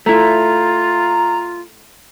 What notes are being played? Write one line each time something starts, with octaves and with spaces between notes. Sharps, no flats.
A3 E4 F4 A#5